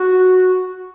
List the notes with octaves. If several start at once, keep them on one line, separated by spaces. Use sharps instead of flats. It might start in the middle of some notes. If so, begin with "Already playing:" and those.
Already playing: F#4